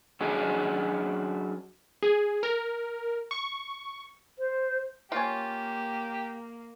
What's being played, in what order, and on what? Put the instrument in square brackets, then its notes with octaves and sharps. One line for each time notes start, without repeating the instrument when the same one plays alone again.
[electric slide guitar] F#3 C#4 D4 F#4 G#4 D#5
[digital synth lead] G#4
A#4
C#6
[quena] C5
[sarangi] A#3 [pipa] C#4 F4 [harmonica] G4